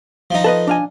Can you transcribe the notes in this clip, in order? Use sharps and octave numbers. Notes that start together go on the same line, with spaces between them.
F3 D#4
A4 B4 D#5
D4 F5 G#5